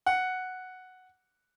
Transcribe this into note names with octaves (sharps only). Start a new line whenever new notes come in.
F#5